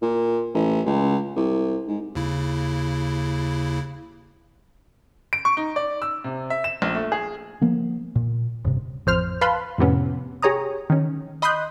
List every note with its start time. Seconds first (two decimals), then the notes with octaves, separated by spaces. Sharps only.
0.02 A#2
0.54 A1
0.86 C#2
1.36 C2
1.88 G#2
2.15 D#2 C#3 E4
5.33 D7
5.45 C#6
5.57 D#4
5.76 D5
6.02 E6
6.24 C3
6.50 E5
6.64 E7
6.82 A#1
6.95 A3
7.12 G#4
7.61 F3 A#3 B3
8.15 A#2
8.64 D#1 G2 C3
9.06 A1 F2 C5 F6
9.41 B4 F5 A5 B5 C6
9.78 F2 A2 C3 B3 C#4
10.42 G4 G#4 C#5 A#5 D#6
10.90 D#3 C#4
11.42 D#5 B5 C6 D#6 F#6 G6